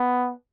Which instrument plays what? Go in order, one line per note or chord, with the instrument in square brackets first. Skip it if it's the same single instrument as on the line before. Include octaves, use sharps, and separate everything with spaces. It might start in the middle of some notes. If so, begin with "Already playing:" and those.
Already playing: [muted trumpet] B3